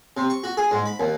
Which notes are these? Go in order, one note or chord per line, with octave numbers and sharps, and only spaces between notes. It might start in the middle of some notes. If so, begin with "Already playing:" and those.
C3
C#6
F#4
G#4
G#2
B5
D#2